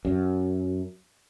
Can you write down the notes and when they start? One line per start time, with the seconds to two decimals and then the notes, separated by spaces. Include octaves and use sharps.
0.05 F#2